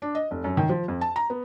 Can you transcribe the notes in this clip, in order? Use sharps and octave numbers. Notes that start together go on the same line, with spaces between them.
D4
D#5
F1
F#2
D#3
F3
F2
A5
A#5
B3